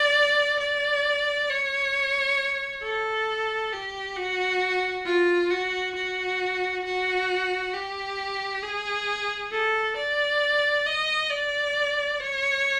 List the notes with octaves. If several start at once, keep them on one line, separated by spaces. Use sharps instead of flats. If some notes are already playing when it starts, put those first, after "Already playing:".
Already playing: D5
D5
C#5
A4
G4
F#4
F4
F#4
F#4
F#4
G4
G#4
A4
D5
D#5
D5
C#5